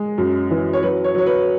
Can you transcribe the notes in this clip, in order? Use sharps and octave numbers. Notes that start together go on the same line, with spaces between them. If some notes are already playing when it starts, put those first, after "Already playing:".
Already playing: G#3
F#2
E3
C#5
F#3 B4
C#5
F#3 C#5
B4